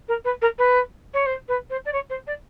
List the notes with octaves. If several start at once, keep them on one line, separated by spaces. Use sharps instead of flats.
A#4
B4
A#4
B4
C#5
C5
B4
C5
D5
C#5
C5
D5